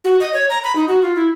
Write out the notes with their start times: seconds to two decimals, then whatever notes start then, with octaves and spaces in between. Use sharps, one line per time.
0.04 F#4
0.20 D#5
0.33 C#5
0.50 A#5
0.64 B5
0.76 D#4
0.88 F#4
1.02 F4
1.16 E4